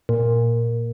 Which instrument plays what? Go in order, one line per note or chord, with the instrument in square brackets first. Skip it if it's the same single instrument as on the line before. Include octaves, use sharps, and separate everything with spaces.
[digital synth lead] A#2